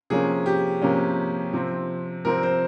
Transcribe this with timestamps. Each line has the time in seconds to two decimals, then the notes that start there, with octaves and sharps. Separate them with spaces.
0.10 C3 F3 A#3 C#4 G#4
0.46 G4
0.82 C3 F3 A#3 C#4
1.53 C3 F3 C4
2.25 C3 F3 C4 A#4
2.43 C5